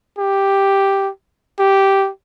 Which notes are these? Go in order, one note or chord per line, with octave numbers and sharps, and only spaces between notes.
G4
G4